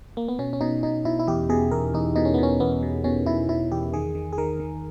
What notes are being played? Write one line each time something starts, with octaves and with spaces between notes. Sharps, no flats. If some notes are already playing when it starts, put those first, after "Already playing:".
A#3
B3
B2 C#4
C#4
B2 D#4
B2 D#4
B2 E4
E4
E2 G4
B2 G#4
E2 A#4
E2 D#4
B2 D#4
C#4
B3
B2 C#4
E2 B3
B2
B2 C#4
B2 E4
B2 E4
E2 G4
D#3 G#4
D#3
G#4
D#3 A#4
D#3